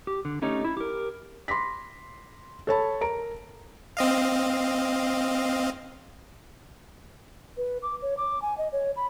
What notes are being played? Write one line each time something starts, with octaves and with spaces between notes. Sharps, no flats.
G4
D3
A3 C#4 D#4 G4 C#5
E4
G4 A#4
B5 C6 D6 A#6 B6
A4 C#5 A5 B5
A#4 A#5 D7
C4 D#5 F5
B4
D6
C#5
D6
G#5
D#5
C#5
B5